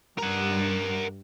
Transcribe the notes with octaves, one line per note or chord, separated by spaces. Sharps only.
G2 A#4 F#5